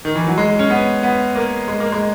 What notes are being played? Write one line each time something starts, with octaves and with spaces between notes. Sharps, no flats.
D#3
E3
F#3
G#3
C#4
B3
B3
A#3
G#3
A#3
G#3